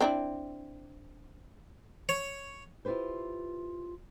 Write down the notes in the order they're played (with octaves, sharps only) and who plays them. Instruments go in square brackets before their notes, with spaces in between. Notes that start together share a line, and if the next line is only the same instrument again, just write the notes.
[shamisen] C4 D4 E4
[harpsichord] C#5
[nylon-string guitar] E4 F4 G4 B4 C5